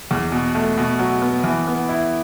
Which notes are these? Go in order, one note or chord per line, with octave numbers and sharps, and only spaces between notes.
E2
B2
A3
B2
F#3
B3
E3
B3
E4